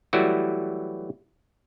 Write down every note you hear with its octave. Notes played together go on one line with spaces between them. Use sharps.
E3 F#3 G3 A3 E4 F#4